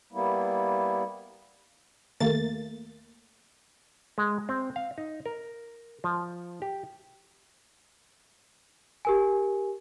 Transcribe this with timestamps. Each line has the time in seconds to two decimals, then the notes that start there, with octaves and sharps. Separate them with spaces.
0.12 G3 A#3 B3 E4
2.20 D#2 A3 A#3 A6
4.18 G#3
4.49 C4
4.76 F5
4.98 D#4
5.26 A#4
6.04 F3
6.62 G4
9.05 G4 A#4 G#5